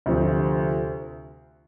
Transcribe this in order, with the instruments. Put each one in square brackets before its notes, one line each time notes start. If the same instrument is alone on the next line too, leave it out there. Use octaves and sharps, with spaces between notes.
[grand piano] D2 C3 F3 C4